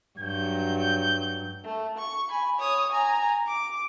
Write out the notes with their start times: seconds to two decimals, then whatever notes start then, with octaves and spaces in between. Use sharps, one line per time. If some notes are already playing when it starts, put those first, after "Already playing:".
0.19 G2 F#3 G6
1.64 A3
1.98 C#6
2.30 G#5 B5
2.59 C#5 D#6
2.92 G#5 A#5
3.47 D6